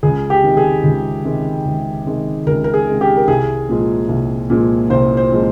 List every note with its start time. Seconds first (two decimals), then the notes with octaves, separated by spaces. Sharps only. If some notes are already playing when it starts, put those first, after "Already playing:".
0.03 C#2 G#4
0.30 G4
0.43 C3 D#3 G#3
0.57 G#4
0.83 C#2
1.25 C3 D#3 G#3
1.65 C#2
2.06 C3 D#3 G#3
2.46 C#2 A#4
2.64 A#4
2.74 G#4
2.87 C3 D#3 G#3
3.01 G4
3.17 A#4
3.27 C2 G#4
3.69 A#2 F3 G#3
4.09 C2
4.50 A#2 F3 G#3
4.90 C2 C5
5.17 C5
5.32 A#2 F3 G#3